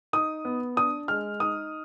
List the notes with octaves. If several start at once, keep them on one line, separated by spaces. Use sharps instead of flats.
D#4 D#6
B3
D4 D#6
G#3 F6
D#4 D#6